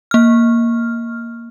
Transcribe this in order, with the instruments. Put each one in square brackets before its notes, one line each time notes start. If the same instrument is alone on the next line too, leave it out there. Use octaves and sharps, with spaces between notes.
[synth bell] A#3 F6